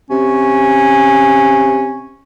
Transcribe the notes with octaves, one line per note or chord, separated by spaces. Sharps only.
C3 C#4